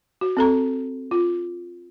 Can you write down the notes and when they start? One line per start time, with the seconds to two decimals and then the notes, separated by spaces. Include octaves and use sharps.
0.21 F#4
0.37 C4 A4 A#5
1.11 F4